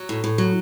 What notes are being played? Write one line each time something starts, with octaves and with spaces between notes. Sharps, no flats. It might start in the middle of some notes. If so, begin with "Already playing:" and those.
Already playing: F#3
A2
A2
F#3